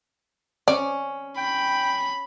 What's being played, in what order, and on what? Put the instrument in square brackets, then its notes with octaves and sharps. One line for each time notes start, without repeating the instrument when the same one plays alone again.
[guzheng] C#4 [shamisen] D5
[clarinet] G5 [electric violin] B5